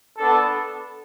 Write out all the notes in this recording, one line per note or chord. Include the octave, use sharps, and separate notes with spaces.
B3 D4 A4